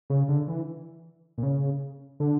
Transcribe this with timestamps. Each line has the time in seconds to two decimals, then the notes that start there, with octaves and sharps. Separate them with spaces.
0.10 C#3
0.29 D3
0.48 E3
1.38 A#2
1.43 C#3
2.20 D3